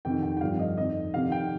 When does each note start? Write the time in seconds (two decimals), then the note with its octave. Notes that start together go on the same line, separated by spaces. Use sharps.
0.05 F2 C3 D#3 G5
0.23 G5
0.37 G5
0.41 G2 D3 F3 F5
0.59 D#5
0.77 F2 D#3 D#5
1.14 F2 C3 D#3 F5
1.32 G5